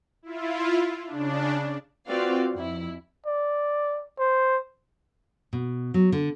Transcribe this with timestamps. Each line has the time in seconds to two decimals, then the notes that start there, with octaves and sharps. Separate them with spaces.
0.22 E4 F4
1.07 C#3 D4
2.09 C4 F4 F#4 B4 D5 F5
2.53 F2 E4
3.26 D5
4.19 C5
5.53 B2
5.94 F#3
6.12 D3